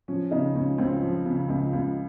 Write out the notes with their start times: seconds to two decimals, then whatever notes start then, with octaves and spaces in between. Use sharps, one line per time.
0.08 F3 C#4
0.31 C#3 D#4
0.55 C#2 C#4
0.78 C#2 C4
1.03 F3
1.26 C#3
1.49 C#2
1.73 C#2